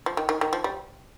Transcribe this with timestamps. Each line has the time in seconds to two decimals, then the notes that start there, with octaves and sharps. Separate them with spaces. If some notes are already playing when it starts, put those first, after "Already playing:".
0.06 F3
0.17 D#3
0.29 D#3
0.41 D#3
0.53 F3
0.64 G3